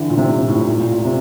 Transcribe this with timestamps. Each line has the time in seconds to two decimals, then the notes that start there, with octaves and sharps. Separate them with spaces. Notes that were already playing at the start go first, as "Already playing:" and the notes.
Already playing: D3 E3
0.10 A#2
0.18 C3
0.30 C3
0.42 A#2
0.48 A2
0.55 A#2
0.67 A2
0.80 A#2
0.92 A#2
1.05 C3